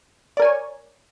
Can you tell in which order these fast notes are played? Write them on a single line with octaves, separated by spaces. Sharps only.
D5 A#4 G#5 C#5